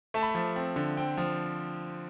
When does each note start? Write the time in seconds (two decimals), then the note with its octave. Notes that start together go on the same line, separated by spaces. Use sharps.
0.14 A3 A5
0.23 B5
0.30 A5
0.35 F3
0.56 C4
0.76 D3
0.97 C4 G5
1.17 F3